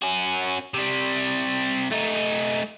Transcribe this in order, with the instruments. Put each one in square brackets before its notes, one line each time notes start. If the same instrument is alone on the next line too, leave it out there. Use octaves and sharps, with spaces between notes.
[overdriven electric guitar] C#4 F#4
C3 G3
A3 D#4